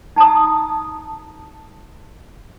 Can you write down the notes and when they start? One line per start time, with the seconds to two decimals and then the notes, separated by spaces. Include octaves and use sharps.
0.16 D#4 A5 A#5 D#6